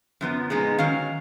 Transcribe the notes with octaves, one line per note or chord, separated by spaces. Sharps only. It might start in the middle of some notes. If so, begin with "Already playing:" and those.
F#2 F3 B3
A#2 G#3 B3 D#4
D#3 F#3 C#4 F5